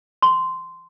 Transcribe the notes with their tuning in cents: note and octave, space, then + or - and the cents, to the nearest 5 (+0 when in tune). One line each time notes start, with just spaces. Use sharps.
C6 -10